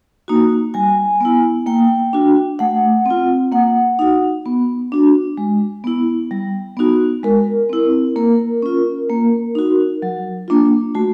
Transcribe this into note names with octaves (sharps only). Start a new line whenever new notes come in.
A#3 D#4 F#4
G3 G#5
B3 E4
A#3 G5
D4 F#4
A3 F#5
C4 F4
A#3 F#5
D#4 F#4
B3
D4 F#4
G#3
B3 E4
G3
B3 D#4 F#4
G#3 A#4
C4 E4
A#3 A#4
C#4 F4
A#3
D#4 F#4
F#3
A#3 D4 F4
A3 F#4